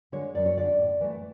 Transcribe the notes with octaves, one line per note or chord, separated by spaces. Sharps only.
D3 G#3 C#5
F#2 D5
C#5
D3 G#3 D5
A2
E3 A3